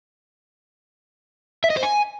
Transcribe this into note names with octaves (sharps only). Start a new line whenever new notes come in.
E5
D#5
C5
G#5